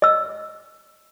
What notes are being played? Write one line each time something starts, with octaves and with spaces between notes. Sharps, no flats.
D#5 E6